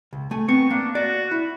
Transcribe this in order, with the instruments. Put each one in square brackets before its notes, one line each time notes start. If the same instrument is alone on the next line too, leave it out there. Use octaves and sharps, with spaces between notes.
[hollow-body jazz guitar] C#2
A3 G#5
[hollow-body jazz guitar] B3 C4 [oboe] C#6
[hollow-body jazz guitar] A#3 [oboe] D4
[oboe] F#4 [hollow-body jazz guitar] D5
[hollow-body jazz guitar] E4